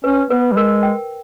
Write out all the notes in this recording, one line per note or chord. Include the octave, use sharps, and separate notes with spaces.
C#4 B4
B3 B4
G3
G#3 A#4
G5